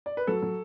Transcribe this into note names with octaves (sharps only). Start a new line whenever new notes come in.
D5
B4
F#3 A4
F#3